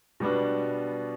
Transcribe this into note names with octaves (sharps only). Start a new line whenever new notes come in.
B2 G3 B3 D4